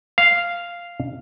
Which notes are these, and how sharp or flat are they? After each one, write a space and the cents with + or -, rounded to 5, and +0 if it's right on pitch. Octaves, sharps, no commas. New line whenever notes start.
F5 -5